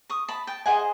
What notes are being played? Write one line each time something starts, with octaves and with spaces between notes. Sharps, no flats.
C#6 D#6
A5 B5
G5 A5
G#4 C5 D#5 F#5 G#5